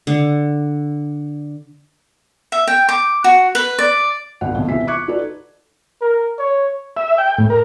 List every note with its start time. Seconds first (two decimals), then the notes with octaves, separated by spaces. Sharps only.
0.07 D3
2.52 E5
2.67 G5
2.89 D6
3.24 F#4
3.55 B4
3.79 D5
4.41 G1 C2 F#5
4.55 D#1 B1 C3
4.68 E1 E2 C3 E4 E5 B6
4.87 C#6 D6 F#6 G#6 C#7
5.08 D#4 F#4 A4 B4 D5
6.01 A#4
6.38 C#5
6.97 E5
7.18 G5
7.38 A2
7.50 A#4